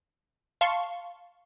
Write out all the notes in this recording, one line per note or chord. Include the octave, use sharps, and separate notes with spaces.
F5 A5 C6 C#6